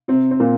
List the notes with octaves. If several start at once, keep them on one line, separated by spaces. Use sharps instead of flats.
C3 C4
C4
A#2 A#3